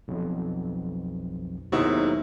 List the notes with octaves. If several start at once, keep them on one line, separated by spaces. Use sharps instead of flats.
B1 F2
D#2 B2 F#3 G#3 C4 D#4 E4